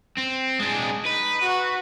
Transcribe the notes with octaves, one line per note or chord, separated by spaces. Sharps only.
C4
G#3 D4 G#4
D#4 B4
F#4